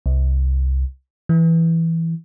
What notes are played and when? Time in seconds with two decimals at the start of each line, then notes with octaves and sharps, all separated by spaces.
0.06 C2
1.29 E3